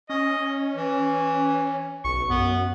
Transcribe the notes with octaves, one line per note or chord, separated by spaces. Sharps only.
C#4 D#5
E3
B1 C#6
F#2 B3